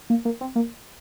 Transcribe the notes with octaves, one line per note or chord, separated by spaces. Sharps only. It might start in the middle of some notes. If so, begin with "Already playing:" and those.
A#3
A#3
C4
A#3